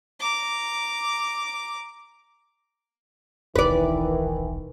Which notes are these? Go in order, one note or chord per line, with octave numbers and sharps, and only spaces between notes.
A#5 D6
D#1 B1 D#3 E3 B4 D5